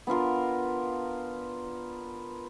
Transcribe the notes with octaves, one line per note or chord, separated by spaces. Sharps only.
B3 D4 F4 A#4